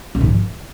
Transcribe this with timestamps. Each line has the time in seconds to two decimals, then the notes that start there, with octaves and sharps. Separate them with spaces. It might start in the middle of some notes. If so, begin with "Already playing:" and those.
0.15 F#2
0.21 G#2
0.27 F3